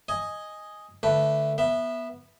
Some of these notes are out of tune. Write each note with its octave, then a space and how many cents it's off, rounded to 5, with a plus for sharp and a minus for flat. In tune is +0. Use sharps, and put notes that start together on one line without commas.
D#5 +0 G#5 +0
D3 +0 A3 +0 B4 +0
B3 -15 E5 +0